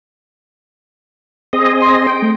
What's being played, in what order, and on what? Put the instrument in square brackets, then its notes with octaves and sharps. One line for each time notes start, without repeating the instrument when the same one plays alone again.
[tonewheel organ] C4 G#4 D#5
[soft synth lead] C6
[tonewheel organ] G5
[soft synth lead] A3